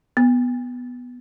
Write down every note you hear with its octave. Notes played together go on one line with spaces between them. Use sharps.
B3